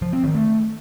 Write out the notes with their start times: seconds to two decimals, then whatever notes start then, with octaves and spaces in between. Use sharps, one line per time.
0.02 F3
0.13 C4
0.24 D#3
0.34 A3